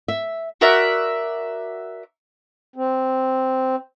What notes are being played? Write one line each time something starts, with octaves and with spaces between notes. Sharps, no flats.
E5
F#4 A#4 D5 E5
C4